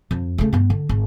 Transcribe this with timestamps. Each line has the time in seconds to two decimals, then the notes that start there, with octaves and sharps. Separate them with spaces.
0.11 F2
0.38 C#3 A3
0.53 G2 B3
0.70 D3
0.89 G#1